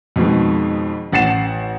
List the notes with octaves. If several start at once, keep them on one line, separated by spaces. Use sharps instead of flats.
F2 B2 D#3 G#3
A1 F#5 A6 C7 E7